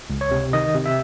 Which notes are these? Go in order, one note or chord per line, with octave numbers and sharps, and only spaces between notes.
C#2
C#5
C3
D#3 D#5
C3
E5